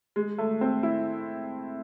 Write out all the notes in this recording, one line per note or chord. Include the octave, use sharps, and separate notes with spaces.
G#3
A3
C4
E4